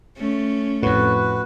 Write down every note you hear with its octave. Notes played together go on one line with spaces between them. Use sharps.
A3 C#4
F2 A2 F#4 B4